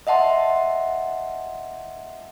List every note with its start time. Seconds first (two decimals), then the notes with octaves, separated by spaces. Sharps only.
0.07 D#5 E5 F#5 A5 C6